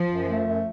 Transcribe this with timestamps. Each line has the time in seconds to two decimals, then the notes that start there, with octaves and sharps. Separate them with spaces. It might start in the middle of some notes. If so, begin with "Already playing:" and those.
Already playing: F3
0.09 F#2
0.28 A3
0.46 F#2